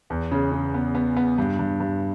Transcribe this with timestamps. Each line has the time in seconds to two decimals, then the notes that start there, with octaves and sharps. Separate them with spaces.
0.10 E2
0.31 C#3
0.52 C#3
0.74 B3
0.95 B3
1.16 B3
1.38 G2
1.59 G2
1.80 G2